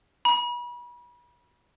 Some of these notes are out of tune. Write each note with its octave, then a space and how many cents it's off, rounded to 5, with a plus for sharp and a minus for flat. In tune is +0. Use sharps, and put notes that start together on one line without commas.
B5 -35